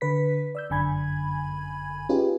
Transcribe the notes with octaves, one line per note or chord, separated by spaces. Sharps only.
D3 B4 B6
D5 E6 G6
G1 F#2 D3 G#5 B5 G#6
C#4 D#4 F4 G4 G#4 B4